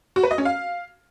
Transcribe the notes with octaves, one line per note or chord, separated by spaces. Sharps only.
F#4
B4
D#5
C#4
F5